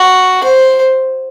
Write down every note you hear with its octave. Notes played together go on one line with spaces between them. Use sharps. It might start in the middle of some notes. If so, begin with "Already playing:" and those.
Already playing: F#4
C5